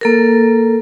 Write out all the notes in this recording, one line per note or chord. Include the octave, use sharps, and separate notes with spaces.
A#3 A4 A#4